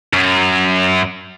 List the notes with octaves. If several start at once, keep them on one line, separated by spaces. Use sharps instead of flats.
F#2